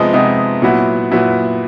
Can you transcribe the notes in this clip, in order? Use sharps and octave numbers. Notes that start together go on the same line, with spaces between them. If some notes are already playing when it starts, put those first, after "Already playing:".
Already playing: C3 F3 G#3 B3 D#4
C3 F3 G#3 B3 D#4
A#2 F#3 B3 E4
A#2 F#3 B3 E4